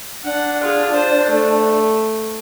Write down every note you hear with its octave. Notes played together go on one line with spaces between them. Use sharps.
D4 F#5
F4 G#4
C5
A3